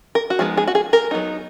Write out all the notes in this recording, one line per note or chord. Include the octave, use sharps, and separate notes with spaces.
A#4
F#4
F3 G#3 B3 D#4 G#4
G#4
F#4
G#4
A#4
F#3 B3 D#4